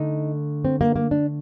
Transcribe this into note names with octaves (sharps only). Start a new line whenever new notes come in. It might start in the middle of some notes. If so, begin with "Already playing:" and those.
Already playing: D3 A3 D#4
C4
A#3
A#3
D4